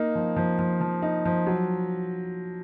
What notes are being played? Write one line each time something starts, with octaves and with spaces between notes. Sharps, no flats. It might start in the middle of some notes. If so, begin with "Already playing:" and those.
Already playing: A#3 D#4
F3
F3
F3
F3
D#4
F3
F#3